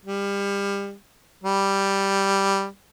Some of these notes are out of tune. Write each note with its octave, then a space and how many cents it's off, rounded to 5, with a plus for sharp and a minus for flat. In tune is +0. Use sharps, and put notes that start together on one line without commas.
G3 +30
G3 +0